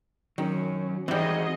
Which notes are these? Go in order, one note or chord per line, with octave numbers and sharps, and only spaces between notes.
D#3 F#3 C#4
E3 G3 C4 D#4 F#4 G#4 D#5